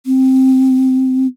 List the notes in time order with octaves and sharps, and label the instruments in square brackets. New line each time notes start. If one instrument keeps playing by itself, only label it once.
[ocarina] C4